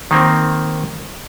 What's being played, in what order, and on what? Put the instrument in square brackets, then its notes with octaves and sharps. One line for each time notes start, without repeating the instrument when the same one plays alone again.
[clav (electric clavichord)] D#3 A#3 C4